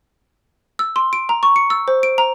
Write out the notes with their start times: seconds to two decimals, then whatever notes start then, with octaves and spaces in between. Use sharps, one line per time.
0.79 E6
0.96 C6
1.13 D7
1.29 A#5
1.43 C#6
1.56 C#7
1.70 E6
1.88 C5
2.03 D7
2.18 A#5